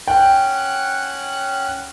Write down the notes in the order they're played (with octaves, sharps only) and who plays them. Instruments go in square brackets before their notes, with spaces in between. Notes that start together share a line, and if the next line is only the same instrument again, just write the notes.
[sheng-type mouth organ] C#4 F#5 F#6 [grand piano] G5